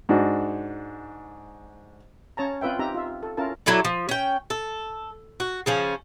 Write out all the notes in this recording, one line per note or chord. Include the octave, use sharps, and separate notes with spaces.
G#2 D4 F#4
C#4 C#5 A5 A#5
C4 F4 B4 E5 G5
C4 D#4 G4 E5 A#5
F4 E5
A4
C#4 E4 F4 A#4 A5
F#3 E4 A4 D5
F3
C#4 G5
A4
F#4
C#3 F3 C#4